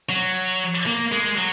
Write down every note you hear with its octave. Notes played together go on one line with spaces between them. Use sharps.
F#3
A#3
G#3
F#3